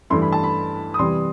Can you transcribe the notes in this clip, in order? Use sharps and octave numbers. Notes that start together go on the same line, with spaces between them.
G2 E3 A3 E4 C6
B5
A5
B5
D#6
C3 E3 G3 C6